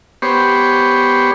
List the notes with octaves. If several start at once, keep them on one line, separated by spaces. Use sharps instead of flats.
B3 G4 C5 C#5